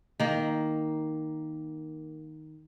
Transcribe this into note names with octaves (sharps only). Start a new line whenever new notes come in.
D#3 A#3